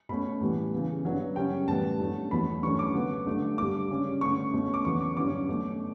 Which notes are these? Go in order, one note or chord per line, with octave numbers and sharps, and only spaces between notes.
B2 A3 C#4 B5
A2 E3 G3 B3
C#3 E3 B3
G2 F#3 B3
F#2 C#3 G3 C#4 G5
A2 E3 G3 B3 A5
G2 F#3 A3 C#4
E2 B2 F#3 A3 B5
G2 E3 A3 C#4 C#6
D6
C#3 F#3 B3
G2 D3 A3
G2 D3 G3 D6
C#3 G3 C#4
G2 D3 A3 C#4 C#6
B2 A3 C#4
D6
E2 C#3 F#3 B3 C#6
D6
G2 D3 F#3 C#4 D6
B2 A3 C#4